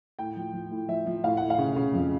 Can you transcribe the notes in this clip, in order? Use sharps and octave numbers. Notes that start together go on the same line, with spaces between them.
A2 G5
F3
F3
A2
F3 E5
F3
A2 F5
A2 F#5
F5
C#3
C#3
F2